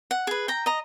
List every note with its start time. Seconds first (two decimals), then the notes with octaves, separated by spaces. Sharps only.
0.11 F#5
0.27 G#4 B4
0.48 G5 A#5
0.66 D#5 A#5